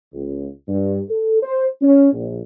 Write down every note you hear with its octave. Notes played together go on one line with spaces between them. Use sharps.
C#2
G2
A4
C5
C#4
A#1